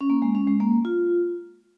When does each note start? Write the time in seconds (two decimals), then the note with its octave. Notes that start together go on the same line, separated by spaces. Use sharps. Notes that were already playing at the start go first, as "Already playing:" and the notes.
0.01 C#4
0.10 A#3
0.22 G#3
0.35 C#4
0.47 G#3
0.60 A#3
0.85 F4